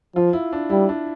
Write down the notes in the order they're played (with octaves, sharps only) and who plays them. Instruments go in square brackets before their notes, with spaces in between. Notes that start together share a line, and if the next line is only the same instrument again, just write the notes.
[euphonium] F3 [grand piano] F4
[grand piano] E4
D4
[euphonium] G3 [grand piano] E4
[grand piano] D4